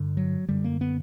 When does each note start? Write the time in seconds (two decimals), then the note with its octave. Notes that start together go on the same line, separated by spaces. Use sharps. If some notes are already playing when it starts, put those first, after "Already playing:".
Already playing: G2 D3
0.17 F#3
0.49 F#2 D3 G3
0.64 A#3
0.81 B3